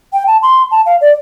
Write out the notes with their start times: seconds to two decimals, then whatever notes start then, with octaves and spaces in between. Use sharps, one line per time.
0.13 G5
0.27 A5
0.42 C6
0.71 A5
0.86 F5
1.01 D5